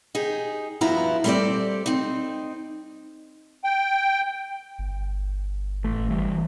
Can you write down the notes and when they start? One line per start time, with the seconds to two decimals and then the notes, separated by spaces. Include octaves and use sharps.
0.15 D#4 G4 G#4
0.81 G2 F3 B3 E4 F#4 A#5
1.24 G3 C4 G4 A4 C5 D5
1.86 C4 D#4
3.64 G5
4.78 G1
5.84 A1 A3
6.10 E3 G3